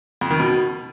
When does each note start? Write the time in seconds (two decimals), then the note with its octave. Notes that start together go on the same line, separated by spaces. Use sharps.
0.21 F2
0.30 D#3
0.40 B2